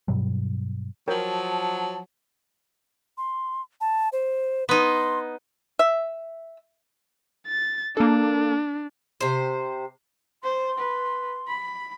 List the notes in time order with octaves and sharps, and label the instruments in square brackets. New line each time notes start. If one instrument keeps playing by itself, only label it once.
[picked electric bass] G2 B2 F#3 G3
[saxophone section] F3 F#3 [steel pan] A#4 C#5 G5 [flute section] A5
[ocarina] C6
A5
C5
[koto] B3 D#4 [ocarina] C6
[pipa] E5
[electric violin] A6
[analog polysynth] A#3 A4 [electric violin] D4
[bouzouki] C3 C5
[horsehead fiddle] C5 [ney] C6
[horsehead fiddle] B4
B5